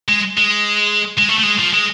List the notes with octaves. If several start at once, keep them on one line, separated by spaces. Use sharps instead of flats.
G#3
G#3
G#3
A3
A3
G#3
F3
G#3